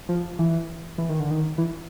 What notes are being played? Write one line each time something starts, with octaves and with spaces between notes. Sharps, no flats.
F3
E3
E3
D#3
D3
D#3
E3